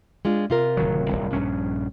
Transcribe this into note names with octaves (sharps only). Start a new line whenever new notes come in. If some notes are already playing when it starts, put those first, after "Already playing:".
G#3 D4 F4
C3 F4 A#4
D1 D#3 F#3
D1 G1 C2
A#1 G2 C#4